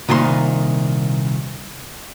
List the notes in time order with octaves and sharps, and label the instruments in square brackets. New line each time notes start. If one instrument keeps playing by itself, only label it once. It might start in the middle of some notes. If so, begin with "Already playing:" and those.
[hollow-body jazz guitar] C2 A#2 D#3 C6